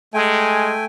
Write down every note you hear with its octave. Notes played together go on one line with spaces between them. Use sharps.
G#3 A3 G5 G#5